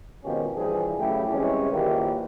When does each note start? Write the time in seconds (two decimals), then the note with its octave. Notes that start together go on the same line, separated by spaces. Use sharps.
0.24 G#1 B2 D#3 F3 C#4 G4
0.57 G2 E3 F3 G3 G#4
0.99 C#3 F#3 A3 E4 G4
1.31 C3 E3 G3 G#3 C#4
1.71 A#1 D#2 D#3 E3 F4 G4